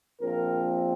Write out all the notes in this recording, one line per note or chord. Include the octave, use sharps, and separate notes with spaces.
A#1 A#2 F3 C4 A#4